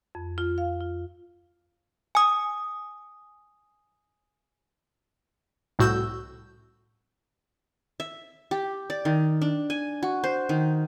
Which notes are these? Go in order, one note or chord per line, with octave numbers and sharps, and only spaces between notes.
F2
F4
F5
F4
G#5 D#6
C2 A2 F#4 E6 G6
E5
G4
D5
D#3
D4
G#5
F#4
C5
D#3